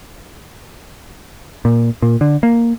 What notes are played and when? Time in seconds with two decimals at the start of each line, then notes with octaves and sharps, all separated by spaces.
1.65 A#2
2.02 A#2
2.21 D3
2.43 A#3